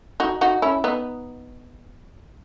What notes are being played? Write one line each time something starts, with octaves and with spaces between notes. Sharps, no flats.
D#4 F#4
D#4 F#4
C#4 E4
B3 D#4